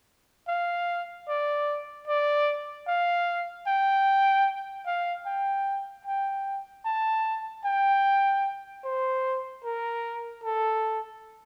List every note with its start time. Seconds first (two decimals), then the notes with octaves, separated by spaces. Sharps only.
0.48 F5
1.28 D5
2.08 D5
2.88 F5
3.67 G5
4.86 F5
5.26 G5
6.06 G5
6.86 A5
7.65 G5
8.84 C5
9.64 A#4
10.44 A4